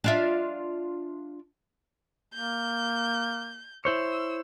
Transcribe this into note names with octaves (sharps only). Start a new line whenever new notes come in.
D4 F4 E5
A#3 G6
E4 C5 C#5 E6